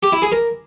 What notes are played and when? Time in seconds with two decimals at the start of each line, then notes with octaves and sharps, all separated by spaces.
0.03 G4
0.12 E4
0.22 G#4
0.32 A#4